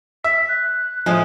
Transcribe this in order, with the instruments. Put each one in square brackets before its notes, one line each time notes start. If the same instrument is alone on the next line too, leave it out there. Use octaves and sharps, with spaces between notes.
[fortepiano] E5 [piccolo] B6
[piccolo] F#6
[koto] A2 G#3 [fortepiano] F3